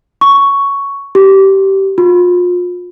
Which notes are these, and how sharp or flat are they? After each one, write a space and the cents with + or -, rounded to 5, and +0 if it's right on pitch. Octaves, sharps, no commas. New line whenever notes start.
C#6 +5
G4 -20
F4 +35